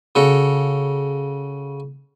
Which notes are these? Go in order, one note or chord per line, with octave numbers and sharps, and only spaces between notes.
C#3 F#4 A4